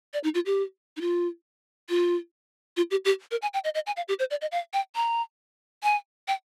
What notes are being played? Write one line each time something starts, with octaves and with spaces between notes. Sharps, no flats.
D5
D#4
F4
G4
D#4
F4
F4
F4
G4
G4
A#4
G#5
G5
D#5
D#5
G#5
F5
G4
C5
D5
D#5
F5
G5
A#5
G#5
G5